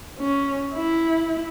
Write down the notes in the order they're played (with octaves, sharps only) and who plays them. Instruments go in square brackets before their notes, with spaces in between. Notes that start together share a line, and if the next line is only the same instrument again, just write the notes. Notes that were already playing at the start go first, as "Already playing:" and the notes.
[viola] C#4
E4